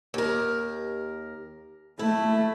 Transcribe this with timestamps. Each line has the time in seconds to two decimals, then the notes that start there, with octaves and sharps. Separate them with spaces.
0.14 D#2 A#4
1.99 A3 E4